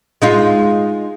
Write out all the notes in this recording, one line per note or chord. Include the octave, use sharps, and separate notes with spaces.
G#3 D#4 F4